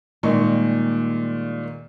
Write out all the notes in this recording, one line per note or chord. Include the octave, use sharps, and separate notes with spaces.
A#2 D#3 G3 G#3 A#3 C#6